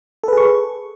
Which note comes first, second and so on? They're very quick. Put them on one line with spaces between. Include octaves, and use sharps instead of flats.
A4 B4 G#4 C#6